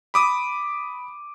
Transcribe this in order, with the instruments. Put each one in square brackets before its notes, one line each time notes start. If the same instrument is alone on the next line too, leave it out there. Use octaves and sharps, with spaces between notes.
[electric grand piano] B5 D6 D#6